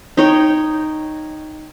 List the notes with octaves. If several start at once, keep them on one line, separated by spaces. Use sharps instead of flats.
D#4 C#5 G5